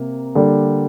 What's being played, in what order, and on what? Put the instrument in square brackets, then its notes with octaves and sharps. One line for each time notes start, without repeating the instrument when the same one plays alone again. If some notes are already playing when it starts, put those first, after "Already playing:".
Already playing: [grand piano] C3 A#3
D3 G3 A#3